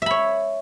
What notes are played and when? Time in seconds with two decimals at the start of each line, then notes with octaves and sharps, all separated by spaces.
0.02 E5
0.06 B5
0.11 C#5